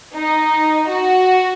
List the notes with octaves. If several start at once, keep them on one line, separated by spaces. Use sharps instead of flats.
D#4
F#4